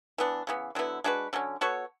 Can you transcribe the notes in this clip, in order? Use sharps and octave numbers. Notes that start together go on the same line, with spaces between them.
E3 B3 D4
C#3 E3 B3
D3 F#3 B3 E4
G#3 D4 F#4 B4
D3 F#3 C#4
B3 F#4 A4 C#5